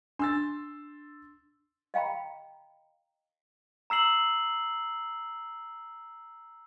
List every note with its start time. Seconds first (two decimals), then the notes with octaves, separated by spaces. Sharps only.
0.19 D4 C6 E6 A6
1.94 D#5 F5 G5 A#5 B5
3.90 A#5 E6 C7 F#7